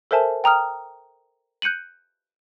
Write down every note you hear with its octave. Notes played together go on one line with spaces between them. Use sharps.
A4 A#4 C5 E5 G#5 A5
G5 A#5 D#6 F6
F#6 G6 C#7 D#7 F#7